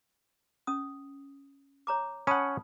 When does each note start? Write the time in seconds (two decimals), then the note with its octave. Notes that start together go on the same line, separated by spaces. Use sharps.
0.67 C#4 D#6
1.87 C#5 A#5 D6
2.27 C#4 F#5 A5 B5 D#6